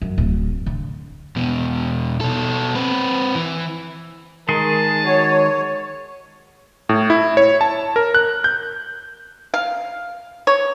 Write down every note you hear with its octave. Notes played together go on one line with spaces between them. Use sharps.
F#2
D1
D3
E2 B2
B2 A4
C4 B4
E3
D#3 G#3 G#4 A#4 A5
F#3 C#5
A2
E4
C#5
A5
A#4
F#6
G6
F5
C#5